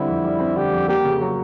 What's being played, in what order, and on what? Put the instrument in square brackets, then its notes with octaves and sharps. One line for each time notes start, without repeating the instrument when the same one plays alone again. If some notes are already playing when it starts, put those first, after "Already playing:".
Already playing: [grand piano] D3 G3 C4 [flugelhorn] E4
[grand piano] F2
G3
C4
[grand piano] D3 [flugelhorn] G4
[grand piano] F2
[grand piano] A#3 [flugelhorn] G4
[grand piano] C#3
F#3